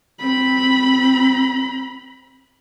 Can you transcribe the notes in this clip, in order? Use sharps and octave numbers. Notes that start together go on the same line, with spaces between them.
C4 B5